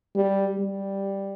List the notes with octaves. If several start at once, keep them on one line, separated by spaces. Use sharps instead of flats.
G3
G3